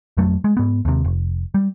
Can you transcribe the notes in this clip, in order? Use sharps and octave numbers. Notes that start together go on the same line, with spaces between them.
F2 F#3 A3
G#3
G#2 B3
D#2 C3
F1
G3